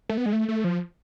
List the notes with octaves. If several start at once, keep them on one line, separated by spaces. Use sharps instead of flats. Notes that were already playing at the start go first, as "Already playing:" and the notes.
A3
B3
G#3
A3
A3
F3